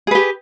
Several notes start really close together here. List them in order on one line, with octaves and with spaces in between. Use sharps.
G#4 B4 G4